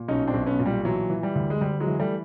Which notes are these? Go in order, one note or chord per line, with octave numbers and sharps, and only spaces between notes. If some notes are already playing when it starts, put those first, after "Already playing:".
Already playing: A#2
B1 C#4 D#4
C4 D4
B1
B3 C#4
A#2
G3
E3 F#3
E3
G3
D2
G#3
D2 G3
F#3 G#3
E3
G3 A3